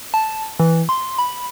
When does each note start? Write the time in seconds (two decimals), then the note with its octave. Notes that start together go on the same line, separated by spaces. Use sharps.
0.14 A5
0.60 E3
0.89 C6
1.19 B5